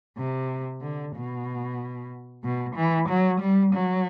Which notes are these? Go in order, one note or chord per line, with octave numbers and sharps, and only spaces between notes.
C3
D3
B2
B2
E3
F#3
G3
F#3